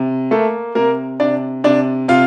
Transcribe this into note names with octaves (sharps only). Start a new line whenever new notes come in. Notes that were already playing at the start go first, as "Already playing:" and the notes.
Already playing: C3
A3 A#3 A4
C3 A#3 A#4
C3 D4 D5
C3 D4 D5
C3 F4 F5